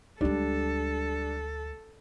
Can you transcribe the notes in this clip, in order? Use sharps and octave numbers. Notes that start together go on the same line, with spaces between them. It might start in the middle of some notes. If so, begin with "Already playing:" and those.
D2 G3 G#3 D4 A4